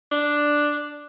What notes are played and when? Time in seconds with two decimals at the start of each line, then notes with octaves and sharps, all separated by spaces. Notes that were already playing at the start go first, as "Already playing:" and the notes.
0.12 D4